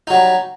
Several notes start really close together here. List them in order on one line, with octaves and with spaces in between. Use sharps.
D#4 F#3 G3